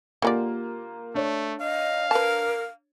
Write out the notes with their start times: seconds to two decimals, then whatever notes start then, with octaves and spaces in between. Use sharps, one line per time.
0.22 D3 G#3 A#3 F4 G4 D5
1.15 A3 D4 C#5
1.61 D#5 F5
2.11 A#4 B4 A5